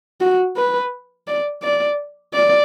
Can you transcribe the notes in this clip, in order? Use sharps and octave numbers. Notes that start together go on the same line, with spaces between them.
F#4
B4
D5
D5
D5